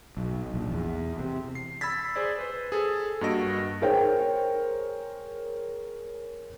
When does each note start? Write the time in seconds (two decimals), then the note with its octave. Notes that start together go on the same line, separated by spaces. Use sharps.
0.17 B1
0.54 A#1
0.71 E2
1.20 C3
1.55 C7
1.81 B5 E6 G#6 A6 B6
2.16 G#4 C5 D5
2.38 B4 C5
2.72 G#4 A4
3.21 G2 A#3 F#4 D#5 A#6 D7
3.82 G#4 A#4 C5 C#5 G5